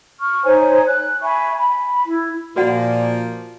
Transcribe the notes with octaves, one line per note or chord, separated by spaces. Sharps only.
C#6 F6
D#4 C5 C#5 G#5
F#6
E5 G#5 B5 C#6
B5
E4
A#2 F3 A#3 F#4 D5 F#5